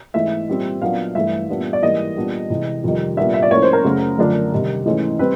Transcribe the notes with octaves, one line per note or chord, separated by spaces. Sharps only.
G#2 E3 A3 E5
A#2 G3 C4
A#2 F#3 B3 D4 F5
G2 E3 A3 E5
A#2 G3 B3 D4
D5
G#2 E3 G3 A#3 D#5
A#2 G3 B3 D4
C3 E3 G#3
F2 C3 D#3 G3
A#2 G3 B3 D4 E5
E5
D5
A2 F3 A#3 C#4 C#5
C5
A#4
F#2 C#3 F#3 A3
F#2 D3 F3 A3 D4
C3 D#3 G3
G#2 E3 A3 C#4
G3 C4 B4